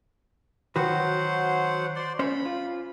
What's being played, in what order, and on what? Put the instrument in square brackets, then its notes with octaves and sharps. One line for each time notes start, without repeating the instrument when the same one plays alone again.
[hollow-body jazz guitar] D#3 F#4 B4 [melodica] F#3 C5 F#5
[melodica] C5 D5 C6
[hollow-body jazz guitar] C#4 C5 [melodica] B5
[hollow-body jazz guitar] F4